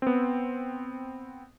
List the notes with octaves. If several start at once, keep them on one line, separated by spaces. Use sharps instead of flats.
B3 C4